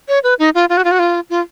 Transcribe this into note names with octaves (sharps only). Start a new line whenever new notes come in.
C#5
B4
D#4
F4
F4
F#4
F4
F#4
F4
F4